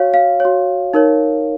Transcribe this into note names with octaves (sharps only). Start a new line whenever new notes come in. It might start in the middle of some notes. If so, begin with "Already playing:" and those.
Already playing: F#4 C#5 F5
F5
F#4 C#5
D#4 A#4 C#5